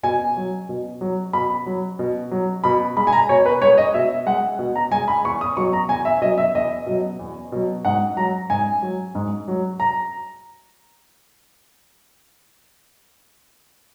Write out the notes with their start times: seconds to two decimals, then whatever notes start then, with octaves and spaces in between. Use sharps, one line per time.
0.03 B2 G#5
0.37 F#3
0.69 B2
1.01 F#3
1.33 B2 B5
1.66 F#3
1.99 B2
2.31 F#3
2.64 B2 B5
2.96 G#3 B5
3.07 G#5
3.13 A#5
3.29 B2 C#5
3.46 B4
3.62 G#3 C#5
3.78 D#5
3.94 B2 E5
4.26 G#3 F#5
4.59 B2
4.76 A#5
4.91 G#3 G#5
5.08 B5
5.25 E2 C#6
5.41 D#6
5.57 B2 F#3 C#6
5.73 A#5
5.89 E2 G#5
6.05 E5
6.21 B2 F#3 D#5
6.38 E5
6.55 E2 D#5
6.86 B2 F#3
7.19 E2
7.52 B2 F#3
7.85 G#2 F#5
8.17 F#3 A#5
8.50 G#2 G#5
8.82 F#3
9.15 G#2
9.48 F#3
9.80 A#5